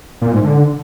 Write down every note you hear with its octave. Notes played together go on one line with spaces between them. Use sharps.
A#2
G#2
D3